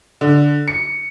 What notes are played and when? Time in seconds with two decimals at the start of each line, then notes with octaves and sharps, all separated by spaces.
0.21 D3
0.68 C#7